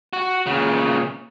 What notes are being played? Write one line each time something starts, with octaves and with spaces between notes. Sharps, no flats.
F#4
A#2 C#3